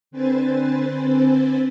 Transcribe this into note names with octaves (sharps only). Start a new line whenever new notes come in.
D3 C4 B4 C5 G#5 A6